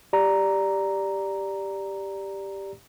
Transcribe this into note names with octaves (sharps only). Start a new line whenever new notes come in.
G4 D5 A#5